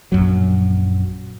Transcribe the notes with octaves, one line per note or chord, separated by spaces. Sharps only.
A#1 F#2 F#3